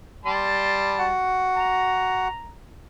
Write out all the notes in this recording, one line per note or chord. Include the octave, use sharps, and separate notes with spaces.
G3 A5 C6
F#4 F#5
A#5